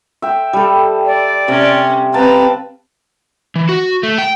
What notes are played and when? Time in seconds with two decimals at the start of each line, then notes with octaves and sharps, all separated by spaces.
0.22 E5 G5
0.53 G3 A4
1.06 D5
1.48 C3 C#4
2.14 C4 B4 F5 G5 A5 A#5
3.56 E3
3.69 F#4
4.03 A3
4.18 G5